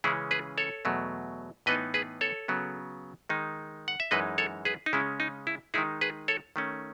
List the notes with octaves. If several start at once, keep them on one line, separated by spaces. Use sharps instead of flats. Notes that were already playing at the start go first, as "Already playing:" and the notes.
C#3 E3 G#3 C#4 E4 G#4
G#4 B4
A4 C#5
E2 B2 F#3 A3
A2 E3 B3 D#4 B4 D#5
G#4 B4
A4 C#5
C#3 F#3 B3
D#3 G#3 D#4
F#5
E5
F#2 E3 G#3 D#4 B4 D#5
A4 C#5
G#4 B4
D#4
C#3 G#3 C#4 E4
D#4
E4
D#3 G#3 D#4 E4 G#4
G#4 B4
A4 C#5
D#3 A3 C#4